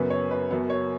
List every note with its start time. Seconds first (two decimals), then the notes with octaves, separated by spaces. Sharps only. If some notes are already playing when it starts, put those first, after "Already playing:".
Already playing: F#1 F#2 C#3 F#3 B3 B4
0.10 C#5
0.31 B4
0.51 F#1 F#2 F#3 B3
0.70 C#5